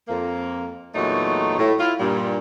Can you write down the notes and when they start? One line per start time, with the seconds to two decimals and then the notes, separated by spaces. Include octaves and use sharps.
0.09 F2 A#3
0.94 E2 A#2 F#3 A3 D#4 C#5
1.59 A2
1.80 E4 F4
2.00 G2 A#2 G3